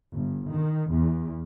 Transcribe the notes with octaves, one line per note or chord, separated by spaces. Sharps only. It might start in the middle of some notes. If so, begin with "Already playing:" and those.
G1
D#3
E2